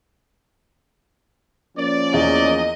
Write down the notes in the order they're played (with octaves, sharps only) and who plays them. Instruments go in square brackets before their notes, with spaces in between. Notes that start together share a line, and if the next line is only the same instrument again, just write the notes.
[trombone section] F3 A#3 C#4 [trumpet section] D5
[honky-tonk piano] E2 [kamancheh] D#5